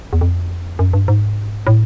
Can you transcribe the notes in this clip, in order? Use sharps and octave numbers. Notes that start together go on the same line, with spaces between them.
E2
F2
F#2
G2
G#2
A2